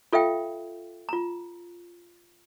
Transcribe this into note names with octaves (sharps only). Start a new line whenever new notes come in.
F4 A4 E5 F5 G5
F4 A#5